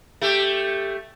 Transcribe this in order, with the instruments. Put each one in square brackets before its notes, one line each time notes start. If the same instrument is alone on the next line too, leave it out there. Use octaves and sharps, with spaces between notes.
[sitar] A3 G4